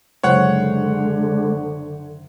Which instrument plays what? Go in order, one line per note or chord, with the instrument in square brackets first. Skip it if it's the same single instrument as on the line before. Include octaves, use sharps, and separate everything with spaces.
[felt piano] F#1 C5 [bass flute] D3 [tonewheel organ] G#3 [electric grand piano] C#5 F#5